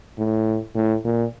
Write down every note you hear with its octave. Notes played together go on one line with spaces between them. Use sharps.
A2
A2
A#2